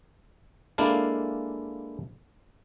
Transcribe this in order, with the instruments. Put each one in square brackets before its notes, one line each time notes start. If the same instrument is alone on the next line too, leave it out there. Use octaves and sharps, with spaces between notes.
[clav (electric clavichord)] G#3 A#3 D4 E4 A4 F5